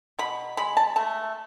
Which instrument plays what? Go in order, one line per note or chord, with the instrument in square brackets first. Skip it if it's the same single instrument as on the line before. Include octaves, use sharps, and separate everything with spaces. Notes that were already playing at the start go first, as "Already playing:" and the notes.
[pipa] B2 B5
G#3 B5
A5
A3 A5